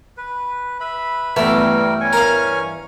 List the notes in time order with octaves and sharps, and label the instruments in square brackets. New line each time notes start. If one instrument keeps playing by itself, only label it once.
[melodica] B4
B4 E5 B5
[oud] G2 E3 B3 [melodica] G3 A#4 G5 [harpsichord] A3
[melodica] C#4 G#5 C#6
[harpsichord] A#4 F5